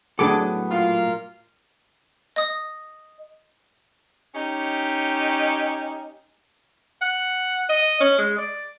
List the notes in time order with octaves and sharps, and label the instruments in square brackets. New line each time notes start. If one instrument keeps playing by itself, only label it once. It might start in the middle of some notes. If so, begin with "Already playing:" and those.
[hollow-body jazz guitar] A2 F#3 A4 [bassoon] B3 [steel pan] D4 G#4 D6
[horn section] A#2 A#3 F4
[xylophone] D#5 D#6
[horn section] C#4 D#4 G4
[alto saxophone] F#5
D#5
C#4
G#3
D5